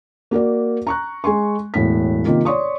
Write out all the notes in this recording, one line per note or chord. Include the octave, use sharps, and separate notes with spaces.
A#3 F#4 A#4 D5
A#5 C#6 F#6
G#3 G#5 C6 C#6
E1 A2 B6
C3 D#3 A#3 F4
C#5 D5 C6 C#6 D#6